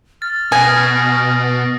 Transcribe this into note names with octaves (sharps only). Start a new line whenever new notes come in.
F6 A6
B2 G#5 D#6 A#6